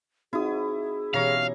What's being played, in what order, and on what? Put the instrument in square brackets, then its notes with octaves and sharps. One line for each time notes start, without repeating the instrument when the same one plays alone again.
[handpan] C4 D#4 F#4 [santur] E4 D#6 [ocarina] G#4
[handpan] B2 E3 G4 [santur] C#4 A#5 C#6 [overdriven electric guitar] F5